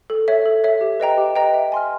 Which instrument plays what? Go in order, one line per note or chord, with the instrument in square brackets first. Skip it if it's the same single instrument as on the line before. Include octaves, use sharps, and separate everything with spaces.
[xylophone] A4
C#5 E5
A4
C#5 E5
G4
B4 D#5 G5 A#5
G4
B4 D#5 G5 A#5
E5
G#5 C6 F6